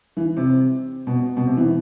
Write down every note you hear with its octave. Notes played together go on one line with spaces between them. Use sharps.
E3
C3
B2
B2
C3
E3